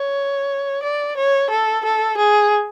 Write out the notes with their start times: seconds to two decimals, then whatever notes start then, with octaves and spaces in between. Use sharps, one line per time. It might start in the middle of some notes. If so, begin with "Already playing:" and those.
Already playing: C#5
0.83 D5
1.17 C#5
1.50 A4
1.85 A4
2.17 G#4